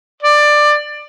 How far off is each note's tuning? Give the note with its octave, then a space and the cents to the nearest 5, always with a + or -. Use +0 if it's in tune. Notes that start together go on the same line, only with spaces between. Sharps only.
D5 +15